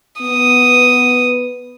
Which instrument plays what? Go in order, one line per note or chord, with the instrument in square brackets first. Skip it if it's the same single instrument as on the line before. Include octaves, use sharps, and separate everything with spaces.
[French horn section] B3 [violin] D#6